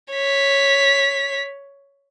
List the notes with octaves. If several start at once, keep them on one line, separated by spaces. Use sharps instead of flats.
C#5 B6